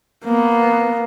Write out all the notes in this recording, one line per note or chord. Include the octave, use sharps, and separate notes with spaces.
A#3 B3